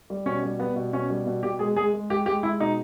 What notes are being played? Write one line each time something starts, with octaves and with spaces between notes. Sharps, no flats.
G3
B2 C#4
G3
G3 B3
B2
B2 C#4
G3
B2
B2 G4
G#3 G#4
G#3 G#4
G#3
G#3 G4
G#3 G4
G#3 E4
B2 D#4